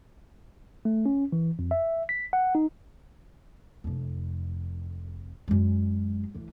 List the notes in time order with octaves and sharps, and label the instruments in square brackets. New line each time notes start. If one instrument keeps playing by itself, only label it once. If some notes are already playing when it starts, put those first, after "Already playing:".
[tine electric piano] A3
C#4
E3
F2
E5
B6
F#5
D#4
[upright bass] F1 F2
F#2 G#3
D2 E3